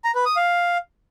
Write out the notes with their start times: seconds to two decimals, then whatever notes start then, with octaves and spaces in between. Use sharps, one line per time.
0.04 A#5
0.15 B4
0.26 D#6
0.36 F5